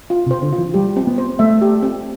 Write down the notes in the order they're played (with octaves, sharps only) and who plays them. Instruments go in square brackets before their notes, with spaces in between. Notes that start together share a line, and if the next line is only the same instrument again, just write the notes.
[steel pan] F4
[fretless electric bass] C3
[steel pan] C5
[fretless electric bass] D3
[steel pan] F4
[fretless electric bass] E3
[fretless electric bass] G3 [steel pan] G4
[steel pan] C4
[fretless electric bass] B3
[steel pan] C5
[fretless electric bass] A3 [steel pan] E5
[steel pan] G4
C4